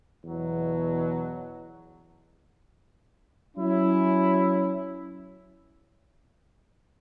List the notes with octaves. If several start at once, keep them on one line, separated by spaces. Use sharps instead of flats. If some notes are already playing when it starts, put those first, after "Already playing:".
E2 B2 F#3
F#3 C#4 E4